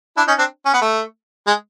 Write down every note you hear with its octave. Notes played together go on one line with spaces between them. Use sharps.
D4 E4
C#4 D#4
C4 D4
C#4
B3
A3
G#3